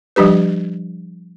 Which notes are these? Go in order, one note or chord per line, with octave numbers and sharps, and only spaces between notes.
F3 G3 D4 G4 B4